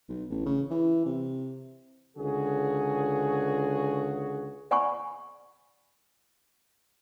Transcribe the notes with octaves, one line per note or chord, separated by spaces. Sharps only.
B1
A1
C#3
E3
C3
C#2 D3 F#4 G#4
D5 F#5 G#5 B5 C#6